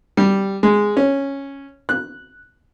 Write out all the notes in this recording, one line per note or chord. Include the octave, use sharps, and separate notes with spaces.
G3
G#3
C#4
F#6